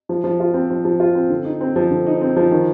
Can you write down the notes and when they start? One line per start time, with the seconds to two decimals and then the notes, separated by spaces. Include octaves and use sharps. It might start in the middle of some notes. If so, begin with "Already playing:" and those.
0.09 F3
0.24 F3
0.40 F4
0.54 C4
0.70 F3
0.85 F3
1.00 F4
1.15 C4
1.30 D3
1.45 D#4
1.61 C4
1.76 F3
1.91 D3
2.07 D#4
2.21 C4
2.36 F3
2.51 D#3